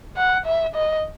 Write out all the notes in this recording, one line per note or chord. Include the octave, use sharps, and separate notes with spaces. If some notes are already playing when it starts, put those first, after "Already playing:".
F#5
E5
D#5